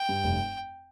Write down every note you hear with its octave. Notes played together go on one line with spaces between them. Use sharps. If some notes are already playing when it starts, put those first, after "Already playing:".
Already playing: G5
G2
F1